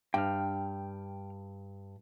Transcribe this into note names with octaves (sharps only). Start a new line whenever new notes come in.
G2 G5 F6